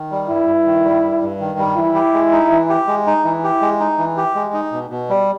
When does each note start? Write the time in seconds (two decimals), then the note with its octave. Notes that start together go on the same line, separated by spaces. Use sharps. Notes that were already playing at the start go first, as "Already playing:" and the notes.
Already playing: D#3
0.11 G3
0.29 G2 E4
0.47 G2
0.66 D#3
0.85 G3
1.03 G2
1.22 G2
1.40 D#3
1.59 G3
1.76 E3 E4
1.95 G4
2.14 G#3
2.32 D#4
2.51 E3
2.70 G4
2.88 G#3
3.07 D#4
3.25 E3 E4
3.44 G4
3.62 G#3
3.80 D#4
3.98 E3
4.17 G4
4.35 G#3
4.54 D#4
4.72 B2
4.90 B2
5.10 G3